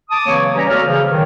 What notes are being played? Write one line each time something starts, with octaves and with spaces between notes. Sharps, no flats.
A5 D6 D#6
C#3 E3 F#3 A#3 C4 C#5
E3 G3 C#4 G4 C#5 A#5
G#3 A#3 F#4 A4 D5 F6
C#3 E3 F3
A2 D#3 E3 F#3